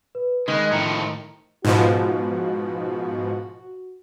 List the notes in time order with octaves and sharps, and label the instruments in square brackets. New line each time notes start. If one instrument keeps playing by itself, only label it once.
[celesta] B4
[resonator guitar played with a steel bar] D#3 [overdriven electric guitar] G#3 [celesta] F#6 G#6
[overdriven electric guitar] A2 F3 [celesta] G5 A#5 C#7
[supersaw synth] G#2 B2 F3 [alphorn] F#4